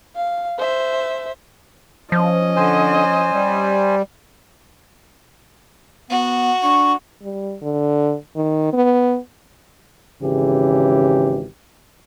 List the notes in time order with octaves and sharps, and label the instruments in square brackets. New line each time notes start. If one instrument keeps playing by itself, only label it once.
[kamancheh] F5
C5 E5
[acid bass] F3 [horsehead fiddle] C#4 D#5
[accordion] D3 [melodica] C5 G#5
[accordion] G3
[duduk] B3 [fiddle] F#4
[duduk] D4 [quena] C#6
[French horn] G3
D3
D#3
B3
[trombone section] G#1 C#3 E3 G4